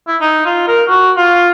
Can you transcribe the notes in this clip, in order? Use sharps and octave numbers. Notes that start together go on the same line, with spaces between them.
E4
D#4
F4
A#4
F#4
F4